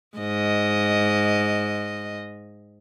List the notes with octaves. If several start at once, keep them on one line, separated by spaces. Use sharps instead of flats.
G#2 D#5